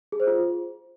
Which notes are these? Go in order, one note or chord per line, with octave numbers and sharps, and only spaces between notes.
G#4
C5
F4